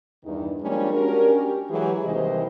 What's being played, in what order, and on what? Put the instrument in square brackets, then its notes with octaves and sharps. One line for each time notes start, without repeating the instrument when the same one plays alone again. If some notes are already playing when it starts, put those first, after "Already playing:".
[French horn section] E2 G2 D#3
F3 G3 G#3 A#3 C#4 D4
C#4 D4 F#4 G4 A#4
G4
E3 F#3 G#3 G4 G#4
D#2 C3 E3 G3 C5 D#5